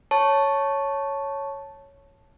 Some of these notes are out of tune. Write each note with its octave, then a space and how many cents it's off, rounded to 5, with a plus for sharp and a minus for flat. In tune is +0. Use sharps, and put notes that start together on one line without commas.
C#5 +0 A5 +0 C#6 +0